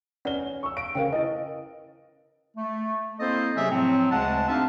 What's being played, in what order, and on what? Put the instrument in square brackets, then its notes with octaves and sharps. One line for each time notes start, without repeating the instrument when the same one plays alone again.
[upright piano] C#4 G7 [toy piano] B4 D5 F#5
[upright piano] C#6 E6
[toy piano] F5 [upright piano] D7
[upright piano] C#3 F5 [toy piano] A#4 C5 G5
[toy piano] E4 B4 [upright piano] D#5
[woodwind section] A3
A#3 C4 E4 A4 C5 D#5
C3 F#3 A3 C#4 G#4 E5
A2 F3 F#3 C4
D2 C#3 G#3 F#5 A5
C4 D4 D#4 E5 F5 A5